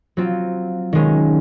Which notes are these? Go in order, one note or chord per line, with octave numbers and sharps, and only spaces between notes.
F#3 C4 F4
D#3 G#3 C#4